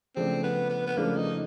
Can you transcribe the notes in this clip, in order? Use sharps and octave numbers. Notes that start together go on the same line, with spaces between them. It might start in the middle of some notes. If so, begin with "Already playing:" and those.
C#3 F3 A3 C4 D4
B3
B3
B3
C#3 F3 A3 A#3 D4
D#4